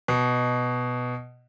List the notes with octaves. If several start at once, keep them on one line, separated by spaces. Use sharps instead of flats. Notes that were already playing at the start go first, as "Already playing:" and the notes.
B2